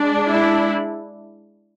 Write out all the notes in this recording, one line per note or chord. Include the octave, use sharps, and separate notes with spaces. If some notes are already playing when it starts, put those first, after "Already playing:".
Already playing: G#3 D4
E4